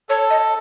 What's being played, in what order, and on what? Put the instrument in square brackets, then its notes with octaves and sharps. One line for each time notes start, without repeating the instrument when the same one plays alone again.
[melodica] A4 [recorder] C#5
[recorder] D#5